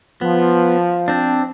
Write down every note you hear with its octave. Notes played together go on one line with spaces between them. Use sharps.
F3 B3
C4 D4